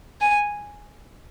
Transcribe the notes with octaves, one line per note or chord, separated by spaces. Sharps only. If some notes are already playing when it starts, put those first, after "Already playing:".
G#5